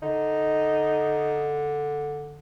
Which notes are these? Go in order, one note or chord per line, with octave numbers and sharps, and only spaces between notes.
D3 D#4